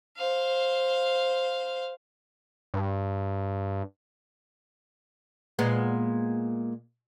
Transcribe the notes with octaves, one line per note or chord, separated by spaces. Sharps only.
C5 F5
G2
A#2 G#3 B3